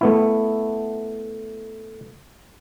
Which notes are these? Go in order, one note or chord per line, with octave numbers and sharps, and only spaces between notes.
A3 B3 E4